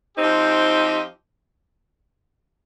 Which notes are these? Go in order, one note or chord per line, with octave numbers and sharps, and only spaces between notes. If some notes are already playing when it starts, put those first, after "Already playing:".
F3 C4 D#4 G4